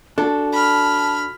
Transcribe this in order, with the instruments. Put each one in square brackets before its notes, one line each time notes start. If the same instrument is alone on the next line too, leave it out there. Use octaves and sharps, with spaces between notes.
[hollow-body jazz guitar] D4 [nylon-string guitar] F#4 A4 [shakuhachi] A5
[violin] B5 F6